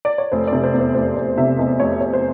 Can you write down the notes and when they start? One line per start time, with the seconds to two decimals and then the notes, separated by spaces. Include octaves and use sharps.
0.05 D5
0.18 C#5
0.32 F1 C5
0.47 D5
0.52 C3
0.64 C5
0.74 E2
0.80 C5
0.95 F1 C5
1.16 F1 D5
1.38 C3 E5
1.59 E2 D#5
1.79 F1 C#5
2.01 F1 C#5
2.13 C5